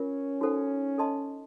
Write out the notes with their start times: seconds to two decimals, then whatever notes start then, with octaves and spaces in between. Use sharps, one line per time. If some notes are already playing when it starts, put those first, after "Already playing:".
Already playing: C#4 F4 A#4
0.41 D#4 F#4 A4 C5 F#5
0.98 A4 D#5 A5 C6